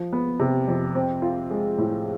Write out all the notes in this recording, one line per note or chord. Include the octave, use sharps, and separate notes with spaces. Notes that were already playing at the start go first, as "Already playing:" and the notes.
Already playing: F3
B3
C3
F2
C4
F4
G#3
A2